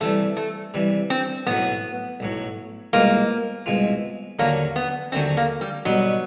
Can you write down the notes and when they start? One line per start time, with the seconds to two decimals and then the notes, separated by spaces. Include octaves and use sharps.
0.01 C3 E3 G3 A3
0.37 A3
0.74 C3 E3 G3
1.10 C4
1.47 B1 A2 F#3 B3
2.20 B1 A2 F#3
2.93 C2 B2 G#3 A#3 C4 F4
3.66 C2 B2 G#3 C4 F4
4.39 D#2 D3 F#3 A3 A#3 C#4
4.76 B3
5.12 D#2 D3 F#3 A3 C4 C#4
5.37 A#3
5.61 G3
5.85 B1 B2 F#3 G3 B3 D#4